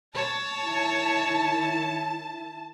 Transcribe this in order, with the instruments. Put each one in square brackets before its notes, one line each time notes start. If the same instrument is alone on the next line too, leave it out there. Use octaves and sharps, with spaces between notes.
[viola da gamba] C#5 [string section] A5
[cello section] D#3 E4